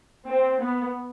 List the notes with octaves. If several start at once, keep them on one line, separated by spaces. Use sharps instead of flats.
C4
B3